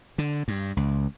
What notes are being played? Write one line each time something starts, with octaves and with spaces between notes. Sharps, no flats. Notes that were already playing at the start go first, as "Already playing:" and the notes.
D3
G2
C#2